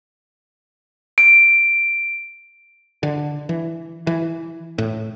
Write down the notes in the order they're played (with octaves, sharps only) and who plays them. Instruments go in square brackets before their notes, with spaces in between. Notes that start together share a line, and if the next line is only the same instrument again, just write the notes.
[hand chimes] D7
[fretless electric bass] D3
E3
E3
A2